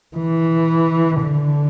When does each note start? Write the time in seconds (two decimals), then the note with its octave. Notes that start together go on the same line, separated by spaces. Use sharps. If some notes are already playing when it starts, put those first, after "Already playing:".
0.17 E3
1.22 D3